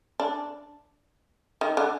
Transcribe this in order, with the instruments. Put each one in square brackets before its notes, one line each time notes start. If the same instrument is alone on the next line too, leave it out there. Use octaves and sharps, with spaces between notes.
[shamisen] D4
D#3
D3